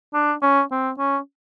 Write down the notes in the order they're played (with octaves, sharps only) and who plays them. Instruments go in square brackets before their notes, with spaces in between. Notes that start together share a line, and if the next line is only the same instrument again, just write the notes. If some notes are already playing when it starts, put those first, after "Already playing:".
[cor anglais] D4
C#4
C4
C#4